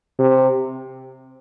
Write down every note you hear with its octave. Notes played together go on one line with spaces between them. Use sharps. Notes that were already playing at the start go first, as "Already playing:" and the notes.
C3